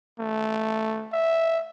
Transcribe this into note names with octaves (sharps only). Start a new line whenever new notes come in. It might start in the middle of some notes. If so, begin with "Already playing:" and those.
A3
E5